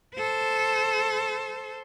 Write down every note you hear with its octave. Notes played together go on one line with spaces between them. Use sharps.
A4 C5